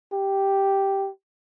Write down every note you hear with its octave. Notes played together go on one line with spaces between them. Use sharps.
G4